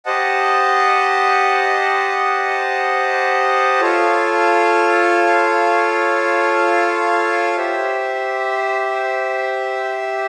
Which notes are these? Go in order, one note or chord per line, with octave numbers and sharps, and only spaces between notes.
G4 C5 D#5 F#5 A5
F4 A4 C#5 F5
G4 C5 E5